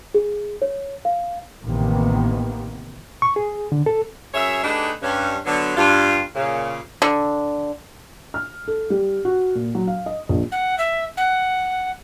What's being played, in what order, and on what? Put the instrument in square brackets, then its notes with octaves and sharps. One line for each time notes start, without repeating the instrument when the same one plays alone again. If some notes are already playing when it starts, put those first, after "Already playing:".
[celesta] G#4
C#5
F5
[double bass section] A1 C3 D#3 A#3 B3
[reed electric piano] C#6
G#4
D3
A4
[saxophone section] F#2 G#4 C#5 E5
A3 D4 D#4 G4 G#4 B4
G2 C#4
D3 F#3 B3
G2 F4
A#2 C#3
[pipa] D3
[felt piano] F6
A4
G3
F#4
A#2
F#3
F5
D#5
A#1
[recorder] F#5
E5
F#5